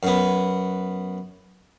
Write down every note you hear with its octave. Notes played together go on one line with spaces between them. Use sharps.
F#2 B3